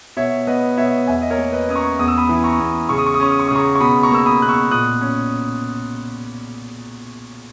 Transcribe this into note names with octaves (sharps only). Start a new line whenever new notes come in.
B2 C#5 E5
B3 B4 D#5
B2 C#5 E5
E2 E5 G#5
D#5
A#4 C#5
A#3
B4 D#5
C#4 D#6
A#5 C#6
E2 D#6
E6
B5 D#6
E3
A#5 C#6
E2
C#3 C#6
D#6
C#6
D#6
C#4 C#6
D#6
C#6
C#3 D#6
A#5 C#6
C#6
B2 B5 D#6
A#5 C#6
A#3 E6
B5 D#6
B2 F#6
C#6 E6
A#2 D#6 F#6
C#4